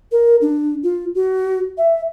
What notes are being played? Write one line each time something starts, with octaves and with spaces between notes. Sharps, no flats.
A#4
D4
F4
F#4
E5